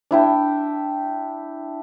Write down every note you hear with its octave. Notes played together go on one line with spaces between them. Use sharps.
D4 E4 G5